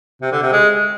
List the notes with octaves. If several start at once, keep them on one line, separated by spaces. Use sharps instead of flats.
C3
D3
C3
G#3